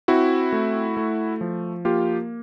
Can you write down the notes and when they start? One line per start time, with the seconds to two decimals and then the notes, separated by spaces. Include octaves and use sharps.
0.08 C4 E4 F#4
0.52 A3
0.97 A3
1.41 F3
1.85 A#3 F4 G4